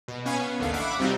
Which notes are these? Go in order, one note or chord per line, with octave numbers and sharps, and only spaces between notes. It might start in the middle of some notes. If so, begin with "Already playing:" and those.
B2
B3 C#4 C#5 F5 G#5 B5
B3
A1 D#2 D3 A3 F5 C7
E5 F#5 B5 D6
C3 G3 C4 D#4 F4 F#4